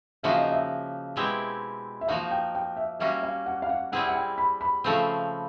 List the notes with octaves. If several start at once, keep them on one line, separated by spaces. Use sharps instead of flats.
C#3 F3 A#3 D#4 F#4 E5
D#5
E5
B2 G#3 C4 E4 G4
E5
F3 A#3 D#4 F#4 F5
G5
G5
E5
G3 A#3 C#4 F#4 E5
F5
F#5
F5
F#5
G3 C4 E4 G#4 F#5
F#5
G5
B5
B5
C#3 F3 A3 C4